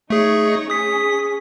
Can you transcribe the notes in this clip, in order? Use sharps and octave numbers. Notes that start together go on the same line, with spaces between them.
A3 D#4 G#4 C#5
C#4 G#4 D#6 B6